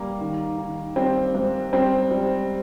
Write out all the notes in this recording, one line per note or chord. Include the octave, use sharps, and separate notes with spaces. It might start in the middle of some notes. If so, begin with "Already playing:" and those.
Already playing: G3 A#3
D#3
D#3
G3 C4
G#2
G3 C4
G3